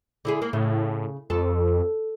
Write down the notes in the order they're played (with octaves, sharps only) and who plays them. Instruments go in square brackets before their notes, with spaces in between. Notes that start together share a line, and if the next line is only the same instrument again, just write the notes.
[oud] D3 E4 G#4
A#3
[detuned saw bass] A2 [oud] C#3
[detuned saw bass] F2 [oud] A4